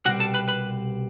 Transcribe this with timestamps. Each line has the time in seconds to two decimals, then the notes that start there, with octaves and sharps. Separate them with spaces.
0.06 C2 B2 G3 C4 F#4 F#5
0.20 A4 A5
0.34 B4 B5
0.48 B4 B5